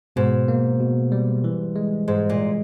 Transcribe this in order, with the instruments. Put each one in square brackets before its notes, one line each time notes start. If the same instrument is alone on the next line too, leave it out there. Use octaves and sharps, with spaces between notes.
[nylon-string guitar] G#2 [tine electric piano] B2
[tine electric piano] A#3
B2
G3
E3
G#3
[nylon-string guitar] G#2 [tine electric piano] G#3
[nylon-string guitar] A#2